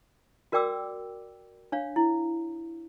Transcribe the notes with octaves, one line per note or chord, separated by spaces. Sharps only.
F#4 A#4 D5 G5 D6 E6
D4 C#5 F5
E4